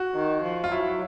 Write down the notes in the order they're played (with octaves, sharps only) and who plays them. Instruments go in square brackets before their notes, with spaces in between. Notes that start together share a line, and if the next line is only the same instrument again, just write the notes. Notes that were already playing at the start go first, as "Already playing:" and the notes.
Already playing: [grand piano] F#4
[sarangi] D#3
F3
[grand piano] F4
[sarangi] F#3 [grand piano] E4